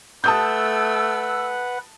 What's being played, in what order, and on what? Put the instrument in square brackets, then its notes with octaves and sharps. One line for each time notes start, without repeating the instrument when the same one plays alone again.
[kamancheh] A3 [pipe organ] B4 F#5 [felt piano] A5 D#6 G6 [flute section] E6